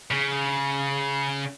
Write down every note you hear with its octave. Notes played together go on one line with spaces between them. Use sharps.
C#3